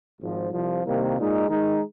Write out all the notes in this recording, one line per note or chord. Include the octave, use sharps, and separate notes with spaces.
G#1 G#2 F3
C2 C3 F3
C2 C3 D#3 A#3
A#2 G#3 D#4
D#3 G#3 D#4